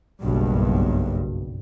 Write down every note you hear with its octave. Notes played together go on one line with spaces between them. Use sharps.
F#1 B1 G2